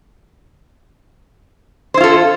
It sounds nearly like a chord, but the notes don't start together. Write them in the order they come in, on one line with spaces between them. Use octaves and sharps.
C5 E4 F4 A4